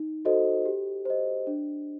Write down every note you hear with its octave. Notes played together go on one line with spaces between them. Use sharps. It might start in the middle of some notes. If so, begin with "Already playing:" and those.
Already playing: D#4
F#4 A4 C5 D#5
G4
C5 D#5
D4